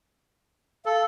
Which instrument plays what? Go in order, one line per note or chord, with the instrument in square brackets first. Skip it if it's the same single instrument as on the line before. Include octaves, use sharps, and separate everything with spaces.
[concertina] A4 [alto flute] F5